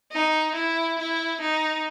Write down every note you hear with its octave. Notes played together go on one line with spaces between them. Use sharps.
D#4
E4
E4
D#4